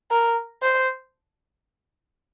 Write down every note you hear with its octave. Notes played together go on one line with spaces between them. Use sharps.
A#4
C5